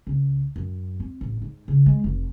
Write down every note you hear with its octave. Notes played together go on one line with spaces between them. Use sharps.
C#2
F#2
C4
A1
G#2
C#3
G#3
F1